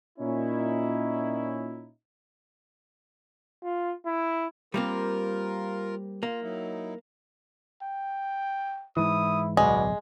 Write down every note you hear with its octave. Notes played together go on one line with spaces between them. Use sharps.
A#2 C#4 D#4 E4
F4
E4
G3 A#3 C4 F4 A#4
A#3 F4
F#3 D#4 E4
G5
G#2 E3 E4 D#6
D1 B1 B2 G#3 D5